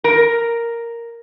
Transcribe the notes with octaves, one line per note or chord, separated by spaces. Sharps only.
A#4